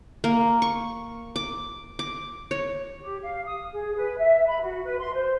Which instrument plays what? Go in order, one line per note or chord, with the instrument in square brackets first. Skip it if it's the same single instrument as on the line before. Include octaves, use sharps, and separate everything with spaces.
[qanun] A#3
C#6
D6
D6
C#5
[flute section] G4
F5
D#6
G#4
B4
E5
B5
F#4
B4
C6
C5